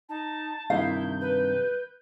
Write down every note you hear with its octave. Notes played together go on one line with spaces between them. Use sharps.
D#4 A5
G2 C3 D#3 E4 F5 G6
B4